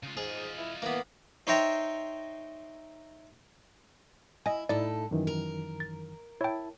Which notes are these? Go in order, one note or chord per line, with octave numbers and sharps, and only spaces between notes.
C#3 F4
G#2 F4 G#4 D#5
E4
E3 A#3 B3
D#4 C5 C#5 E5 G5 A#5
E4 D#5 G#5
A2 D#4 E4 A4 D5
F#2 D#3 E3
A#4
A6
E4 C#5 G5 A5